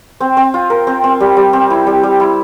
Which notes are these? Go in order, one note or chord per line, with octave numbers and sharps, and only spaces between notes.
C4
C4
F4
A#4
C4
C4
G3
G3
C4
E4
G3
G3
E4